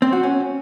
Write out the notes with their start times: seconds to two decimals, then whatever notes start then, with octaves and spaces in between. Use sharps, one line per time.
0.02 C4
0.13 F#4
0.23 C#4